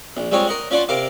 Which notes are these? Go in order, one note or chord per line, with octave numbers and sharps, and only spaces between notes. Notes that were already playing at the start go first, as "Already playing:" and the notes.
A#1
G3 G#3 C4 F4 C#5
A#4 D#5 F#5
C#4 F4 D5 F#5 A5 C6
C3 A#4 F5 D6